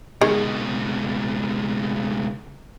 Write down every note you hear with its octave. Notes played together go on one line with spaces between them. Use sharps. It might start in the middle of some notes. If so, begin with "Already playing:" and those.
C#2 B2 D#3 G#3